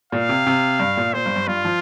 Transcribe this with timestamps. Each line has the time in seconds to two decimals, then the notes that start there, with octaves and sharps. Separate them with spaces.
0.12 A#2 F5
0.29 C3
0.47 C3
0.79 G2
0.97 A#2
1.14 A#2 C5
1.26 G2
1.36 G2
1.47 G2 F4
1.65 F3